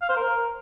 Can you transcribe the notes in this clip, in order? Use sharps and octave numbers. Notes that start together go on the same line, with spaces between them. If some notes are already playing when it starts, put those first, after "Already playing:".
F5
C5
A#4